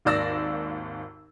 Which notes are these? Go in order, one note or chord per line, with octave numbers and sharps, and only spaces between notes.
G#1 D#2 D5 E6 A#6